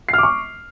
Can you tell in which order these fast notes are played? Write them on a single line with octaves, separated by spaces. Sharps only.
C7 F6 D6 C#6